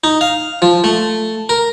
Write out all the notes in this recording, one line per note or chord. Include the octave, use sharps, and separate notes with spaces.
D#4
F5
F3
A3
A#4